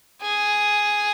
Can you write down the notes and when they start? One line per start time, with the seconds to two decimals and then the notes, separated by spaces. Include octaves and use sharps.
0.22 G#4